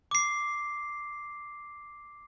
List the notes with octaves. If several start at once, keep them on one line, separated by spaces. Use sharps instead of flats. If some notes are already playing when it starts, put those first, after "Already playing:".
D6 C7